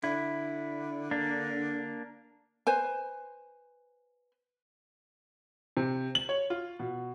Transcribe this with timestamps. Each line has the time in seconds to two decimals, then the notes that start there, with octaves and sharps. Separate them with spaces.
0.04 D3 E4
1.11 A#3 D4
2.67 B4 C5 G#5
5.77 C3
6.15 F#7
6.29 C#5
6.50 F4
6.79 B2